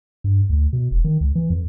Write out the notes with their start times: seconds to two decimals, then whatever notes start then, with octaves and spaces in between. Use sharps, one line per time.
0.24 G2
0.50 D2
0.73 B2
0.91 E1
1.04 D#3
1.21 C#2
1.35 E3
1.50 F2